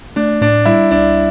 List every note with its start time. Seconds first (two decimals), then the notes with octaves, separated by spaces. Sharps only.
0.16 A3 D4
0.41 A2 D4
0.66 G3 E4
0.91 C2 D4